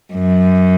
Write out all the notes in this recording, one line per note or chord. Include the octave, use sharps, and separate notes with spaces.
F#2